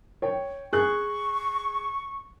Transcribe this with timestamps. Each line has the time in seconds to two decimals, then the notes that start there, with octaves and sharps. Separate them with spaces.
0.22 C#5 G5
0.73 G#4 C#6 F#6